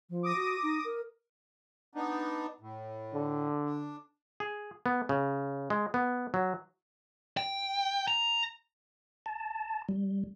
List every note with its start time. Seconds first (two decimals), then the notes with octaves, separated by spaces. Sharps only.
0.10 F3
0.23 D6 D#6 A#6
0.36 F#4
0.63 D#4
0.84 A#4
1.95 B3 D4 D#4
2.61 A2
3.14 D3
3.65 D4
4.40 G#4
4.86 B3
5.09 C#3
5.70 G#3
5.94 B3
6.34 F#3
7.37 G5
8.08 A#5
9.26 A5
9.89 G3